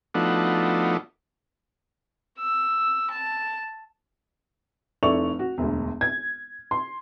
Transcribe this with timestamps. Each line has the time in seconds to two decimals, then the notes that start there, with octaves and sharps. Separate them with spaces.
0.14 F3 A3 B3 D4 D#4 F#4
2.39 E6
3.11 A5
5.03 F1 E4 A4 D5 C#6 F7
5.39 F#4
5.58 E1 D2
6.01 G#6
6.71 C6